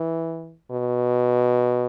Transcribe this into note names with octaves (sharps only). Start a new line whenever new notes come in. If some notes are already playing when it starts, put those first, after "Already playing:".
Already playing: E3
B2